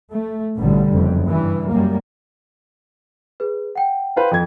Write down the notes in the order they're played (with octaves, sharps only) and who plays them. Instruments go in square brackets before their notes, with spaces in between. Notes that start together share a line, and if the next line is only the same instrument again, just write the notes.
[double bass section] A3
A1 B2 D3 G3
F#1 F2
G2 E3
F#2 G3 A#3
[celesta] G#4 B4
F#5 G5
[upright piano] B4 C5 F5
F2 G#6